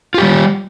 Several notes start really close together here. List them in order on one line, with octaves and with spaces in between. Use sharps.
F4 G4 G3